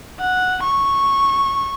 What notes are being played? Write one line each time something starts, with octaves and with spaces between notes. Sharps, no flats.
F#5
C#6